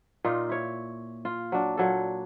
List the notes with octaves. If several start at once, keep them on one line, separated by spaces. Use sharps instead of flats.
A#2 D#4 F4
E4 C#5
F4
F#3 D4
A#2 F#3 A4